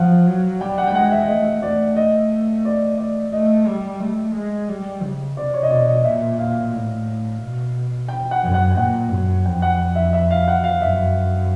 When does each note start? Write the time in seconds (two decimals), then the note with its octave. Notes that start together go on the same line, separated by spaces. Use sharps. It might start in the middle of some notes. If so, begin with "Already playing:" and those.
Already playing: F3 F5 F#5
0.27 F#3
0.61 G3 G5
0.78 F#5
0.87 G5
0.94 G#3 F#5
1.12 E5
1.28 A3 D#5
1.62 A3 D5
1.96 D#5
2.65 D5
2.98 D5
3.33 A3 D#5
3.67 G3
4.00 A3
4.35 G#3
4.69 G3
5.03 C#3
5.36 C3 D5
5.54 C#5
5.63 D#5
5.70 B2 D5
5.87 D#5
6.04 A#2 E5
6.38 F5
6.73 A2
7.41 B2
8.08 G5
8.31 F#5
8.43 F#2
8.54 F#5
8.72 G5
8.77 A#2 F#5
9.11 F#2
9.45 F2 G5
9.62 F#5
9.95 E5
10.13 E5
10.31 F5
10.48 F#5
10.64 F5
10.81 F#2 E5